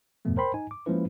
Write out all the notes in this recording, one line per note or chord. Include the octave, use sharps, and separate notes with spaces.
E2 G2 B2 F3 A3 B3
A#4 C5 G5 B5 C6
D#4 G#5
D6
F3 G#3 A#3 C#4 E4 B4